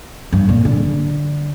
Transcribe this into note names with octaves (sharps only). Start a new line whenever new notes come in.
G2
A#2
D3